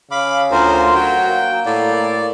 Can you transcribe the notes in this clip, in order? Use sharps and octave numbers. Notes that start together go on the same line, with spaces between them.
C#3 F5 B5 D6
D2 F4 A#4 C5
F#3 F#4 G5
A#3
A2 D5